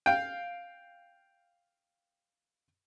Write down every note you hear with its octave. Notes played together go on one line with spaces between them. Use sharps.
F5 G5